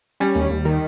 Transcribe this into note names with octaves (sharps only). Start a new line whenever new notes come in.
G3 C#4
D#2
D#2
D#3